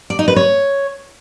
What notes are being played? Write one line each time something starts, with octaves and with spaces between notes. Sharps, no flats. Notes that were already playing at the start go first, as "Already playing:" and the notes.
D5
D#4
B4
C#5